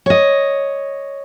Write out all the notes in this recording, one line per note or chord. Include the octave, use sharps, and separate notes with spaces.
C#5 D#5